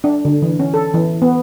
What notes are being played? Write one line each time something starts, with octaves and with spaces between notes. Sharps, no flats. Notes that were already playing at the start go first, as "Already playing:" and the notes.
D4
D3
E3
C#4
A4
E3
B3